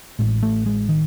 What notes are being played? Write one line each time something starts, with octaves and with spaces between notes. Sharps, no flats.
A1 A2 G#3
A3
G#3
D#3